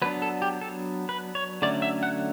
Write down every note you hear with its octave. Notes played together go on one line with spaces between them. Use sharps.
F#3 B3 D4 B4
A4
G4
A4
B4
C#5
D3 F#3 A3 C#4 D5
E5
F#5